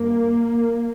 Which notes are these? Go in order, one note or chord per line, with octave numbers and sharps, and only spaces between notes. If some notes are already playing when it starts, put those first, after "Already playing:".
Already playing: G2 A#3